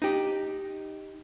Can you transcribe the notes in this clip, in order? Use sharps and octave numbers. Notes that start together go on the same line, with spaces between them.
D#4 G4